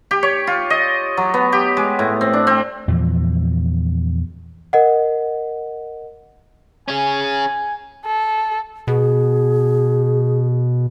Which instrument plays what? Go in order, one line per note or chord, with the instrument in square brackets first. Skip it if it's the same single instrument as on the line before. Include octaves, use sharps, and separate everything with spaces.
[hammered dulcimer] G4
C#5
F4
D#5
F#3
B3
G4
G#3
A2
C4
D4
C4
[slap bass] E2 A#2 F3
[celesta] A#4 D#5 F#5
[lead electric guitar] C#4 G#4 [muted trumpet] G#5
[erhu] A4
[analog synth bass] B2 [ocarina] G#4